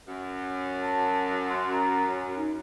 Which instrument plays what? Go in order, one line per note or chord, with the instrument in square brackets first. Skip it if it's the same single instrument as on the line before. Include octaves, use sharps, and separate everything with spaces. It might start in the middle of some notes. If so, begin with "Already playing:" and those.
[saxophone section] F#2
[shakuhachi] A5
C6
A#5
D#4